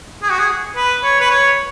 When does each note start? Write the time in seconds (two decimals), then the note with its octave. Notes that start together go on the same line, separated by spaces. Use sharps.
0.22 G#4
0.31 F#4
0.39 G#4
0.76 B4
1.04 C#5
1.20 B4
1.30 C#5